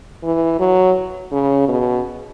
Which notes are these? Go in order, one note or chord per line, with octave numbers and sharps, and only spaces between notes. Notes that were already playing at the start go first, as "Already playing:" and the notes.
E3
F#3
C#3
B2